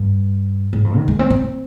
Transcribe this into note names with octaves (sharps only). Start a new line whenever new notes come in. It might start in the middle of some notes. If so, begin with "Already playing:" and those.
Already playing: G2
G#2
F2
D#3
G#3
C4
C4